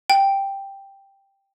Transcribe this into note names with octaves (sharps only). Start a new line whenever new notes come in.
G5